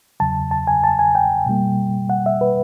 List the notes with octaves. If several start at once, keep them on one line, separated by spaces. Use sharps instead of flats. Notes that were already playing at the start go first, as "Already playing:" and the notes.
E2 C#3 F#3 A5
A5
G#5
A5
G#5
G5
B2 G3 A#3
F#5
E5
B4